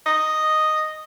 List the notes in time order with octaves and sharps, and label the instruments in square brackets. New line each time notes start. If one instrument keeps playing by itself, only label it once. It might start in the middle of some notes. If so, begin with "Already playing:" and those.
[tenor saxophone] D#5